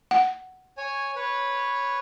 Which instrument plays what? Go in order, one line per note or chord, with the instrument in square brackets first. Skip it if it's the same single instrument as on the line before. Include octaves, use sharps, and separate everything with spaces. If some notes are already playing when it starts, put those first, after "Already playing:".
[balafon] F#5
[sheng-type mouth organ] C#5 G#5
B4 C#5